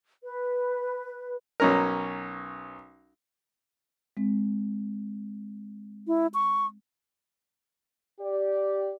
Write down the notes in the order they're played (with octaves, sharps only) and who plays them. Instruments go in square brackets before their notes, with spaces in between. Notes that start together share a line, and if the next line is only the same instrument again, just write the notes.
[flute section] B4
[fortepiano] B1 C#4 A#4
[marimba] G#3 C4
[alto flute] E4
C#6
[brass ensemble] G4 D5